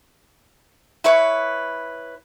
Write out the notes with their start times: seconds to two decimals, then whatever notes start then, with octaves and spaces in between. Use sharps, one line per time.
1.04 E4 B4 C#5 C#6